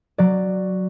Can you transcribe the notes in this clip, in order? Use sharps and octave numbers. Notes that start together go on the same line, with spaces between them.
F#3 D5